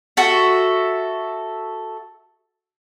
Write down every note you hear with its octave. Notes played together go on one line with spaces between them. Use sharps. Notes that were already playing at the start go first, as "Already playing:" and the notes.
F#4 A4 E5